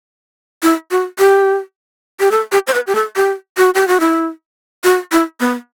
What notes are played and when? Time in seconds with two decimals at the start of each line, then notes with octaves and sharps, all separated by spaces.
0.63 E4
0.91 F#4
1.19 G4
2.20 G4
2.31 A4
2.52 G4
2.67 C5
2.74 B4
2.87 G4
2.95 A4
3.16 G4
3.58 F#4
3.75 G4
3.88 F#4
4.00 E4
4.84 F#4
5.12 E4
5.40 B3